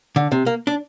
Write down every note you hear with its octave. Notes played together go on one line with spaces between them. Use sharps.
D3
C3
A#3
D4